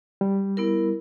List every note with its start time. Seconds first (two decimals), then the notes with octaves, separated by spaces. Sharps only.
0.21 G3
0.57 B3 E4 A#4